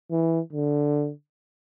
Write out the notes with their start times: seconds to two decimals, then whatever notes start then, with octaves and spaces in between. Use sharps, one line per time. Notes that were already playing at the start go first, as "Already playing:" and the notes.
0.11 E3
0.53 D3